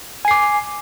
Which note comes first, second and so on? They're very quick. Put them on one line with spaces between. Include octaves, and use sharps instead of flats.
G#5 C7 D6